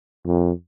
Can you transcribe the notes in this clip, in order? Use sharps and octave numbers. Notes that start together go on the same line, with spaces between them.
F2